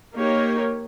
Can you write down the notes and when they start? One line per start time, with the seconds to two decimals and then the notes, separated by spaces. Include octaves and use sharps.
0.15 A#3 D#4 G4 A#4 C#5